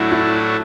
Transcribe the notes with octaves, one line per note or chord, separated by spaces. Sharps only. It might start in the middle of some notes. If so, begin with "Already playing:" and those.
Already playing: A2 F#3 A3 D4 E4 F#4
E4